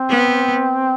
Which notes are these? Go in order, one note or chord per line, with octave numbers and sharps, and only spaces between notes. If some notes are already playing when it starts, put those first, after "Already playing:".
Already playing: C4
B3